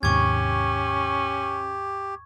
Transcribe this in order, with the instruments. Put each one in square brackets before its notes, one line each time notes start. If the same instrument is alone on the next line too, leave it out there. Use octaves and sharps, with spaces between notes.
[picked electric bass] D#2 G#2 C3 [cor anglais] C#4 [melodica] G4 [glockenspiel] C#6 G#6